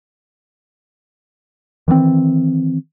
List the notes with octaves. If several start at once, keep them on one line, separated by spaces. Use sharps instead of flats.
D#3 E3 G3 C4